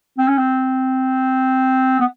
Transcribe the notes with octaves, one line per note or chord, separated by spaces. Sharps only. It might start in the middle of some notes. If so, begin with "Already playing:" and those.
C4
C#4
C4
B3